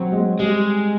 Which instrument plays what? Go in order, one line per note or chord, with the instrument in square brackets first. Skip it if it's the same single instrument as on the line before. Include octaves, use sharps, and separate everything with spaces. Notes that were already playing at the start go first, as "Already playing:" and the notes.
Already playing: [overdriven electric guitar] F#3 [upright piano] C4
[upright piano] G#3
[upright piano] G3 [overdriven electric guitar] G#3